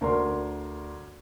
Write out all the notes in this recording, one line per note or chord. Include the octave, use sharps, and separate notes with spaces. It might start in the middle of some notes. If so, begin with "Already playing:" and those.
D2 A#4 D5 C6